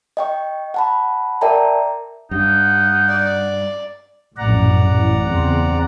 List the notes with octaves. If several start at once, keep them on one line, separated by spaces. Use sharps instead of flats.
D#5 G5 C#6
F#5 A5 B5
A#4 D5 E5 G5 A5 A#5
G2 D#4 F#5
D5
A#1 F#2 A2 D5 F#5 A#5
A1 E3
E2 C#3 C4